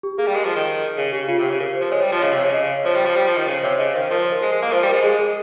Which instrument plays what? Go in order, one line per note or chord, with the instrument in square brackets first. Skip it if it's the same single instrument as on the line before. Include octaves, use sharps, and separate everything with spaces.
[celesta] G4
[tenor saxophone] A#3 [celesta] G#4
[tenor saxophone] G3
[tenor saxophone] G#3 [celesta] A#4
[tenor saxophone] F3
D#3
[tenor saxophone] C#3 [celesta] G#4
[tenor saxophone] C#3 [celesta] G4
[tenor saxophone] C#3 [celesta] F4
[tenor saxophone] C3
[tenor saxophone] C#3 [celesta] G4
[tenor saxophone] C#3 [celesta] A#4
[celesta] C5
[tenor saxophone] F3
[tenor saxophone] G#3 [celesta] C#5
[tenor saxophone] G3
[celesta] C#5
[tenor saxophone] F3
[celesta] C#5
[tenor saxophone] C#3 [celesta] D#5
[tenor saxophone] C3
[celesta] C#5
[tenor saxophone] C#3
[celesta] D#5
C#5
C#5
[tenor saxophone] F3 [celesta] C5
[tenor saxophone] G3
F3
G3
F3
D#3
[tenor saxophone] C#3 [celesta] C5
[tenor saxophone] C3 [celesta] C#5
[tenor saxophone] C#3 [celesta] D#5
[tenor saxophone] D#3 [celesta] C5
[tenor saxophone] F3 [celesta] A#4
[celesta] C5
A#4
[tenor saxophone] G#3
G#3
A#3
[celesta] A#4
[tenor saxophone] F3 [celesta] C5
[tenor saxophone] G3
[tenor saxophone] G#3 [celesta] A#4
[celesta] G#4
G#4